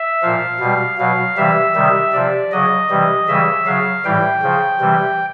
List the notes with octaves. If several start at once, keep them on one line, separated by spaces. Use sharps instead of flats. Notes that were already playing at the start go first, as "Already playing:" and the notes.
Already playing: E5
A#2 F3 F5
B2 G3
B2 F#3 F5
C3 E3 G3 E5
C3 D#3 G3
C3 F3 D5
C#3 F#3 D#5
C3 E3 G3
C#3 E3 G3 E5
C#3 F#3 F5
A2 E3 G3 G5
C#3 F3
C3 E3 G3